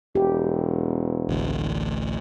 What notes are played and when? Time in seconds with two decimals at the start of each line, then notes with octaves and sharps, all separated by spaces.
0.15 E1 G4
1.29 A1 D2 A2